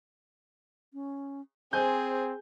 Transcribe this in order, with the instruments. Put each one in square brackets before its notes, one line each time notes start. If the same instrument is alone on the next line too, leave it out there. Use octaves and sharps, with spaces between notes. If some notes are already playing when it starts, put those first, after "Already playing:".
[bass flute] C#4
[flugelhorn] C4 [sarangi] G#4 [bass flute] C5 [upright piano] G#5 G6